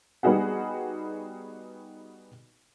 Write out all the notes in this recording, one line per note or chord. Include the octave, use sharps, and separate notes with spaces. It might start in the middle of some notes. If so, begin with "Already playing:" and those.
G3 B3 D#4 F#4 G#4 F#5